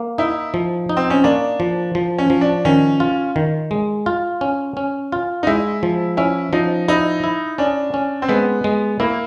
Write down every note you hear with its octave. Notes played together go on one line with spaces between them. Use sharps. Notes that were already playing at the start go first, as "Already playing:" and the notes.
Already playing: A#3
D#4 E4
F3
D#4
C4
C#4
A#3 D4
F3
F3
C#4
F3
D4
D#3 C#4
F4
D#3
G#3
F4
C#4
C#4
F4
D#4
G#3 E4
F3
C#4 E4
F3 D#4
D#4 E4
E4
C#4 D4
C#4
C4
G#3 B3
G#3
A#3 E4